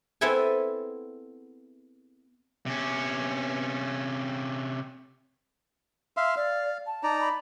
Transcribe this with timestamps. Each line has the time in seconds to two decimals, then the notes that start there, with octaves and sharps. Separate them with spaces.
0.21 B3 C4 E4 A4 E5 G#5
2.66 C3 B3 C#4
6.17 E5 F5 C6
6.36 D5 F5
6.87 A5
7.03 D#4 D5 A#5
7.21 B5